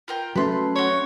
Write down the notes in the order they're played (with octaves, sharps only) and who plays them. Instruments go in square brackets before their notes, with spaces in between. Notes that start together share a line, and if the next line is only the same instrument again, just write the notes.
[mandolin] F4 A#4 G5
[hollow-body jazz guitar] F#3 A3 A4 [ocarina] C#4 [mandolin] B4 C6
[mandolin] F#4 C6 C#6 [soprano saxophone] C#5